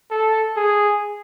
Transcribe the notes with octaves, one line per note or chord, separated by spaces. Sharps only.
A4
G#4